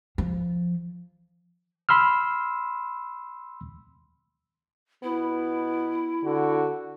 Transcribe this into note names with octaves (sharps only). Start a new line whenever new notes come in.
F3
B5 C6 E6 F6
B2 B3 E4
D3 F#4